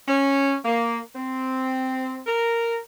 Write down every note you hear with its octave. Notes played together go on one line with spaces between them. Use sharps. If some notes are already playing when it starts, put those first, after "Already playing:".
C#4
A#3
C4
A#4